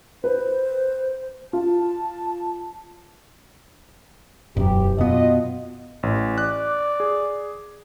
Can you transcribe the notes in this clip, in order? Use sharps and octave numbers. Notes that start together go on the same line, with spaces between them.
B4 C5
F4 A5
E1 F#2 G4
B2 B3 F4 D#5
A1
D5 F#6
G#4